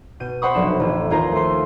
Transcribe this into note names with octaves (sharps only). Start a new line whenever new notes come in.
B2 G6 D#7
C5 F#5 B5 C#6 D#6
F1 B1 D4 E7
A1
D#2 F4 G#4 A#4 C5 A#5
A3 C6